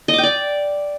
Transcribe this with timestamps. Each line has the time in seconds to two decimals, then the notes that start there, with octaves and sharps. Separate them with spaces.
0.08 D#5
0.13 D6
0.18 G5
0.23 D5